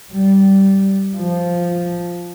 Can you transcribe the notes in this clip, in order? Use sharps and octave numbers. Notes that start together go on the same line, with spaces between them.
G3
F3